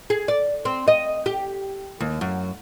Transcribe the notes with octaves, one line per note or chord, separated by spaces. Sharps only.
G#4
D5
C4
D#5
G4
D#2
F#2